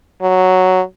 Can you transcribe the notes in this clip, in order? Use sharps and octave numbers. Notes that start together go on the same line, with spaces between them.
F#3